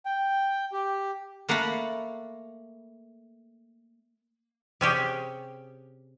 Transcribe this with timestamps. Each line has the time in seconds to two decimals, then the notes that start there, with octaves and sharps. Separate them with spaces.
0.05 G5
0.72 G4
1.49 A3 A#3 F#5 A5 B5
4.81 C3 C#4 G4 G#4